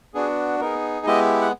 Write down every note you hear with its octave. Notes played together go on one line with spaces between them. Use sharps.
B3 D4 F#4 G#4
B3 D#4 G#4 A#4
G#3 B3 E4 G4 D#5
F#5